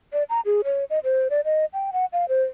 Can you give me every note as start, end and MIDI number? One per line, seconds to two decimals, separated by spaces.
0.13 0.23 74
0.30 0.41 82
0.46 0.61 68
0.64 0.84 73
0.90 0.99 75
1.04 1.28 72
1.30 1.41 74
1.45 1.65 75
1.73 1.91 79
1.93 2.05 78
2.13 2.25 77
2.29 2.43 72